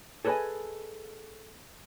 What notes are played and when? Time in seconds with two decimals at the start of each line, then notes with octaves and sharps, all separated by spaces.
0.25 G#4 A4 B4 D5 D#5 G#5